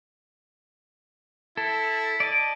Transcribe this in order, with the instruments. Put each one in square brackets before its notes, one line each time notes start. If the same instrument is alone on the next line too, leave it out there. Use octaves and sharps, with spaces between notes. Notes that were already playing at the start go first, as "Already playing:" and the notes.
[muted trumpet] E4 [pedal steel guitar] A4
[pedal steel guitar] D5 D#5 A5